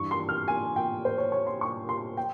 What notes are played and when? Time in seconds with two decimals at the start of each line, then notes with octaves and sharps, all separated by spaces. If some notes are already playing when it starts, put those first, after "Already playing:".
Already playing: G2 E3 C#6
0.11 C6
0.29 F6
0.48 G#5
0.76 G5
1.05 C5
1.18 C#5
1.32 C#5
1.47 C6
1.61 C#6
1.89 C6
2.17 G5